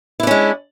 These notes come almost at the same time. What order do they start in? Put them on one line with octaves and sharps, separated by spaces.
E4 D4 C#4 G#3